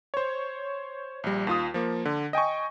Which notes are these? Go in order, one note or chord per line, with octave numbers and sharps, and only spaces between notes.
C5 C#5
A#1 G3
D#2 F4 D#6
F3 A#3
D3
D#5 G5 G#5 C#6